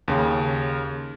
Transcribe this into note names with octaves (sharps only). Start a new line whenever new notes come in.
D#2 C#3